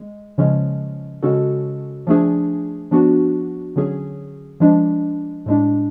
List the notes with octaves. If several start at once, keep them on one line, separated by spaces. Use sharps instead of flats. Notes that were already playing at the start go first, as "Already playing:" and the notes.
Already playing: G#3
C#3 F3 G#3 C#4
C#3 G#3 C#4 F#4 A4
F3 A3 D4 G#4
F3 B3 D4 F#4
D3 F#3 C#4 G#4
F3 G#3 D4
A2 G#3 D4